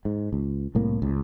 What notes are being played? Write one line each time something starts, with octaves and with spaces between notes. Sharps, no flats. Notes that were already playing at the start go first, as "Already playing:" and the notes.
G#2
C#2
C2 A2 A#3
C#2